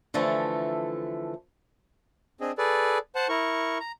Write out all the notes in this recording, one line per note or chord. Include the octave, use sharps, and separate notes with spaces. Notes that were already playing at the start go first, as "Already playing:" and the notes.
D3 E3 F3 A3 A4
C4 D4 G#4 D#5
G#4 A4 B4 D5
C5 F#5 A5
E4 A#4 C#6
A#5